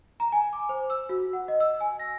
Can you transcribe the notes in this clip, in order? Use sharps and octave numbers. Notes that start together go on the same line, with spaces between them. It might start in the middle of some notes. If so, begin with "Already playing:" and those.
A#5
G#5
D6
C5
E6
F#4
F#5
D#5
E6
G#5
A#6